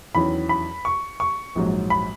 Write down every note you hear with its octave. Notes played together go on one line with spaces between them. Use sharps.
E2 D#3 F#3 C#4 E4 B5
B5
C#6
C#6
A#1 G#2 F#3
B5